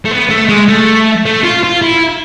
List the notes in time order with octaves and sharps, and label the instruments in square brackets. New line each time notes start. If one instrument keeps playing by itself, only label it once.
[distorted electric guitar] A3
B3
A3
G#3
A3
A3
F4
F4
E4